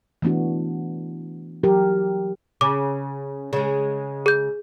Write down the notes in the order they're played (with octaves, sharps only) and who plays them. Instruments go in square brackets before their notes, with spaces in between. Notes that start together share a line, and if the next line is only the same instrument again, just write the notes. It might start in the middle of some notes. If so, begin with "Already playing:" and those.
[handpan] E3 A3 B3 D4 F#4
E3 F#3 G4 A#4
[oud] C#3 [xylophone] D6
[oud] C#3 G#3
[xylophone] G#4 G6